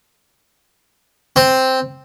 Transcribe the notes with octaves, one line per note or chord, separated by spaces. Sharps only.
C4